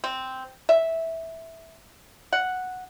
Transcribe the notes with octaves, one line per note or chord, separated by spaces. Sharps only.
C4
E5
F#5